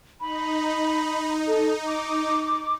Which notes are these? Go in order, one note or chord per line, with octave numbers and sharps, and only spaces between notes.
D#4 B5
A4
D6